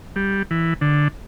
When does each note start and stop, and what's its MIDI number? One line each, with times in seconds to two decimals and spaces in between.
0.16 0.43 55
0.51 0.74 52
0.81 1.08 50